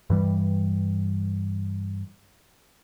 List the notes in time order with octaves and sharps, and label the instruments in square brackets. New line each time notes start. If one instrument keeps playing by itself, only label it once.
[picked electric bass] G2 E3 G3